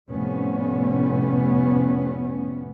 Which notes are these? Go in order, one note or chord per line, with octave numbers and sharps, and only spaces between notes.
F1 A2 C3 G3 B3 C#4